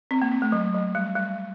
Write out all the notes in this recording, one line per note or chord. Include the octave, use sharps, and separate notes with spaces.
C4
A#3
C4
A3
F#3
F#3
G3
G3